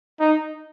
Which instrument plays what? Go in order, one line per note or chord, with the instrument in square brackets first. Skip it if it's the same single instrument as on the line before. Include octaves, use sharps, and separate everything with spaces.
[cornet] D#4